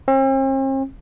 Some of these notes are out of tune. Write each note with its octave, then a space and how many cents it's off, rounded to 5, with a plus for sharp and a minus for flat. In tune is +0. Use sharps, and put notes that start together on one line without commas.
C4 +45